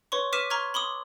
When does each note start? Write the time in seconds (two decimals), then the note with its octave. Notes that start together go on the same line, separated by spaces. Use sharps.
0.12 B4 C#5 C6 C#6
0.33 B4 D6 F6 B6 D#7 E7
0.50 A#5 C6 C#6 F6 G#6
0.74 B5 C6 D6 D#6